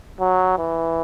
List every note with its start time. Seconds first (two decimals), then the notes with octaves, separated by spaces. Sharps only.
0.20 F#3
0.59 E3